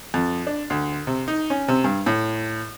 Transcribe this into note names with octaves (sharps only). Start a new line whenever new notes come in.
F2
D4
D2
C3
D#4
C#4
C3
G2
A2